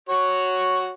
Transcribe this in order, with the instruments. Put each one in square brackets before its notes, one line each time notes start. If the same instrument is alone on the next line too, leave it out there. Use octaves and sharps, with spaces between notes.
[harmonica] F#4 C#5